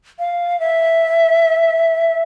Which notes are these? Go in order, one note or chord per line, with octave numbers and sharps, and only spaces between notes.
F5
E5